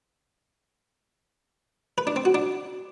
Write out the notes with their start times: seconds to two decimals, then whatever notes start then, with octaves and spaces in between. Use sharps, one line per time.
1.98 B4
2.07 D4
2.16 C4
2.25 F#4
2.34 D4